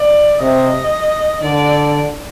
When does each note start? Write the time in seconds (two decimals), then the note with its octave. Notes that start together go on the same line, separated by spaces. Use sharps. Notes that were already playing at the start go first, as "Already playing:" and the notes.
Already playing: D5
0.41 C3 D#5
1.41 D3 D5